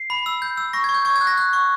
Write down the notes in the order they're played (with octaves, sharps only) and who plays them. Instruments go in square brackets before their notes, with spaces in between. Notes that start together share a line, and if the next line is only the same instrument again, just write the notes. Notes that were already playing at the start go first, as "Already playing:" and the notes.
Already playing: [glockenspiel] C7
B5
E6
G6
E6
C#6 A#6
G#6
C#6
G6
C#6 G#6
G#6
F#6
A#6
F#6
C#6